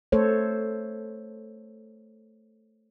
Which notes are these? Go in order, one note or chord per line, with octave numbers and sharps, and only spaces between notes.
A3 A4 C5 C#5